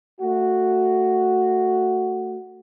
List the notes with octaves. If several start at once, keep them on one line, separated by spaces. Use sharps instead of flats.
A3 F#4